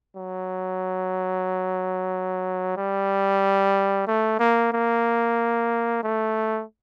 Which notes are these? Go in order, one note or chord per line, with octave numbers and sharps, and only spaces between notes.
F#3
G3
A3
A#3
A#3
A3